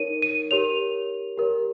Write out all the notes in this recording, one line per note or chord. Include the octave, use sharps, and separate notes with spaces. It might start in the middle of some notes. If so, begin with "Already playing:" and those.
Already playing: D#4 A#4 C#5 D#7
D#7
G4 A#4 C#5 F7
G4 A#4 C#5